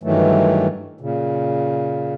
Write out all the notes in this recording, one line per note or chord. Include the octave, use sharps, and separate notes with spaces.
G2 D#3 E3 F#3 A3
A#2 C#3